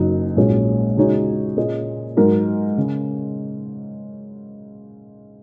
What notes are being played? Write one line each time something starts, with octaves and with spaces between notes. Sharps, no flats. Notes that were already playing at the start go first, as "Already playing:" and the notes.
Already playing: F#1 F#2 F#3 D#4
A#1 G#2 F#3 C#4 G#4
C#3 G#3 D#4 F#4 C#5
A#2 A#3 C#4 G#4 D#5
G#2 F#3 D#4 A#4
C#3